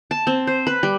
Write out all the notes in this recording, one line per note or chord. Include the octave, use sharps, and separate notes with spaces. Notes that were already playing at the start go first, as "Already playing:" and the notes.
A5
C4
C5
B4
G3